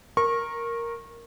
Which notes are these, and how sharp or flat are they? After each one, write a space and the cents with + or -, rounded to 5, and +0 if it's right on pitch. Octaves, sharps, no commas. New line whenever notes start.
A#4 +0 C#6 -25